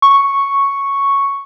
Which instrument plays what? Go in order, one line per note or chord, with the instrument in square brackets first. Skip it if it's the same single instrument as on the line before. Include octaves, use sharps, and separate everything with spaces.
[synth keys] C#6